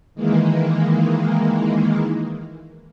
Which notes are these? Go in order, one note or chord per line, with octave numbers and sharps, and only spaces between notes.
D#3 E3 G#3 A#3